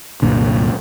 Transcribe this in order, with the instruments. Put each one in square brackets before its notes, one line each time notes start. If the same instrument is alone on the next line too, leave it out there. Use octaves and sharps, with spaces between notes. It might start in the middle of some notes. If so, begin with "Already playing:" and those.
[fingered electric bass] C2 F#2 A#2 D3